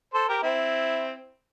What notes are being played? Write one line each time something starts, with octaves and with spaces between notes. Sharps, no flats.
A4 C5
G4 A#4
C4 E4